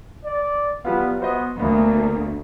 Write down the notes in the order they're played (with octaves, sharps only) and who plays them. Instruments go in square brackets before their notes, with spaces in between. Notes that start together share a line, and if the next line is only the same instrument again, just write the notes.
[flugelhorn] D5
[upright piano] F#3 G3 F4 [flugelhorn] B3
[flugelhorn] B3 [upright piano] F#4 C5 D#5
[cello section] D2 [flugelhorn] A#3 [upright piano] B3